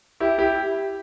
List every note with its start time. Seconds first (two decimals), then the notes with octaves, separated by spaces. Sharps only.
0.20 E4 G4
0.38 E4 G4